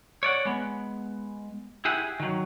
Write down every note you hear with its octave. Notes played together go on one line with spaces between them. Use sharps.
C#5 D5 F#5
G#3 B3
E4 G4 G#4 F#5
D#3 F#3